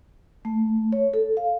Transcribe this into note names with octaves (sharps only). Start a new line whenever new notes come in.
A3
C#5
A4
F5